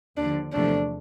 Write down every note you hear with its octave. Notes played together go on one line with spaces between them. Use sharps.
D#2 D3 F3 D4
E2 C3 F3 A3 D4